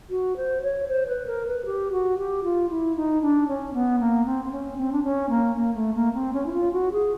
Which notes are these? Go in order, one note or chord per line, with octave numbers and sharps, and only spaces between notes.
F#4
C5
C#5
C5
B4
A#4
B4
G4
F#4
G4
F4
E4
D#4
D4
C#4
B3
A#3
C4
C4
C#4
C4
D4
C#4
A#3
A#3
A3
A#3
C4
C#4
E4
F4
F#4
G#4